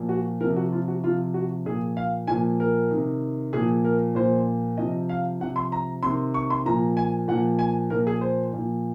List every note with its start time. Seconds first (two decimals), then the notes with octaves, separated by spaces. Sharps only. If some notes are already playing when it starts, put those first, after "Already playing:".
Already playing: A#2 F3
0.09 F#4
0.41 F3 A#4
0.44 C3
0.56 F#4
0.72 F4
0.88 F#4
1.03 C3 F3 F4
1.34 F#4
1.66 A#2 F3 G#4
1.97 F5
2.27 A#2 F3 G#5
2.60 A#4
2.91 C3 D#3
3.53 A#2 F3 G#4
3.84 A#4
4.15 A#2 F3 C5
4.77 C3 F3 D#5
5.09 F5
5.40 C3 F3 F#5
5.56 C6
5.72 A#5
6.03 C3 D#3 C6
6.34 C#6
6.50 C6
6.65 A#2 F3 A#5
6.97 G#5
7.28 A#2 F3 F#5
7.59 G#5
7.90 A#2 F3 A#4
8.07 G#4
8.21 C5
8.53 A#2 F3